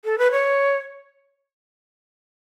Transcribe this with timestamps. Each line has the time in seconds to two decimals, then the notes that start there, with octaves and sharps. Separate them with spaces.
0.05 A4
0.18 B4
0.32 C#5